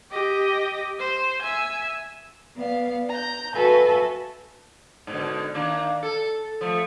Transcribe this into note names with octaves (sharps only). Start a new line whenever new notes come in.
G4 D#5
C5
E5 G#5
B3 D5 F5
A#5 G6
F#4 A4 B4 E5 F5 G#5
G#2 B2 D3
D#3 A#3 D4
A4
F3 A3